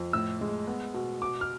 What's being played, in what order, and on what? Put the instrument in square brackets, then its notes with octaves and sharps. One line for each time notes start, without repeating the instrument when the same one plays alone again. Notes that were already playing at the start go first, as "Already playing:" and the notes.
Already playing: [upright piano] F2
A2 E6
G#3
B3
B2
B2 D6
F6